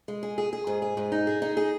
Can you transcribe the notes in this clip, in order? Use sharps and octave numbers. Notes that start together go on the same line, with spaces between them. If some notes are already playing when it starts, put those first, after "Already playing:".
G#3
G#4
G#4
G#4
G#2
G#4
G#2
D#4
G#4
D#4
G#4